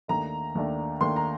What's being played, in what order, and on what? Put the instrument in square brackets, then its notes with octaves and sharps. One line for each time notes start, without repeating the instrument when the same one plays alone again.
[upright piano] D#2 D#3 A3 D4 A#5
D#2 D#3 A3 D4
D#2 D#3 A3 D4 C6
A#5